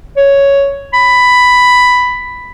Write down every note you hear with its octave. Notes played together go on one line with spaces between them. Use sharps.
C#5
B5